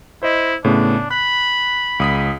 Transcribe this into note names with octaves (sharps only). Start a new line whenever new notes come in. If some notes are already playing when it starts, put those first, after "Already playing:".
E4 C5 D#5
A2 C#3 B3 D4
B5 F#6
C#2 D#6 B6